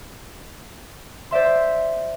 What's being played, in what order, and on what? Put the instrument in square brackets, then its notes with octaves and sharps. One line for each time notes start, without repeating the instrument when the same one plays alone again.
[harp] C5 D5 E5 C6